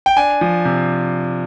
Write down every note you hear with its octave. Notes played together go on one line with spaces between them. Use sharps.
G5
D4 G#5
F3
C3